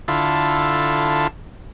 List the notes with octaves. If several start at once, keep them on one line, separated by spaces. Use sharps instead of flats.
D3 E4 F4 A4